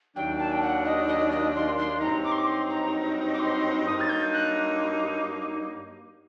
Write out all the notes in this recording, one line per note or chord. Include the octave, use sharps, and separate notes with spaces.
D#2 D#3 F#3 A#3 D4 G5
A5
G5
F#5
D#5
D#5
D#5
C6
C6
G2 F#3 C4 D#4 A#5
D6
C6
D6
C6
A#5
D6
C6
G2 F#3 A#3 D#4 D#6
A6
G6
F#6